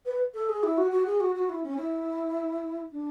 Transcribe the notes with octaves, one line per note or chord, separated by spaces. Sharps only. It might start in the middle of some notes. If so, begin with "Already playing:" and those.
B4
A4
G#4
E4
F#4
F#4
G#4
F#4
F#4
E4
C#4
E4
D4